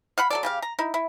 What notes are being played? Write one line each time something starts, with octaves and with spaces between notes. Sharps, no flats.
F5 F#5 B5
F#3 A4 D5
C#3 G4 F5
A#5
D#4 E4
E4